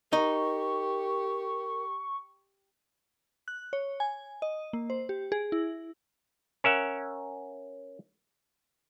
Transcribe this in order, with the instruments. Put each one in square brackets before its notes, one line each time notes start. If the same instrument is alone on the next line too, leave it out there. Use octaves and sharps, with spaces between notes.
[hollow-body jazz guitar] D#4 D#5 [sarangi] G4 [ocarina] A#4 [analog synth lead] C#6
[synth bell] F#6
C#5
G#5
D#5
A#3
C5
G4
G#4
E4
[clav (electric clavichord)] C#4 A#4 E5 F#5